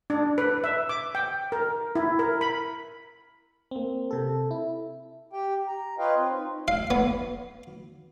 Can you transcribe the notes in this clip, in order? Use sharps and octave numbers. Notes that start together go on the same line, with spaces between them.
D4
B4
E5
D6
G5
A#4
E4
A#4
B5
A#3 C4
C3 A4
E4
G4 G5
A#5
F4 B4 C#5 D#5 F5 G5
C4 F4
D#4
F5
B3